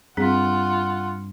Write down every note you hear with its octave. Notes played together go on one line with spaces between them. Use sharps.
G2 C4 F4 G#4 F#5